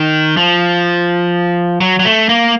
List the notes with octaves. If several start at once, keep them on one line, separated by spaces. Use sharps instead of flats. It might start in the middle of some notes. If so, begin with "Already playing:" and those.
Already playing: D#3
F3
F#3
F#3
A3
A#3